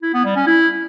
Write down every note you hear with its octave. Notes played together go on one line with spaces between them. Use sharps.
E4
B3
G3
C#4
E4